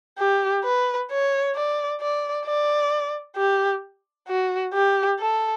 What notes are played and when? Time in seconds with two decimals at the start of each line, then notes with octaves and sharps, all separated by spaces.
0.19 G4
0.64 B4
1.11 C#5
1.55 D5
2.01 D5
2.46 D5
3.37 G4
4.28 F#4
4.74 G4
5.20 A4